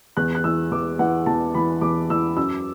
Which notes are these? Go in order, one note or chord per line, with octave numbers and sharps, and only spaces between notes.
E2 F#6
F#6
E3 E6
E2 D6
E3 F#5
E2 A5
E3 B5
E2 D6
E3 E6
F#2 E6